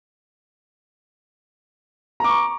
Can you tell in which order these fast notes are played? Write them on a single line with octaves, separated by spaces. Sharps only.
A#5 D6 C#6